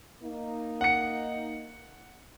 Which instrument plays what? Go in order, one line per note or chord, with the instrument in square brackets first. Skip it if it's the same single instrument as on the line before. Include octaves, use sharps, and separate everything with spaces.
[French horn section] A#3 D#4
[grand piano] F#5 C#7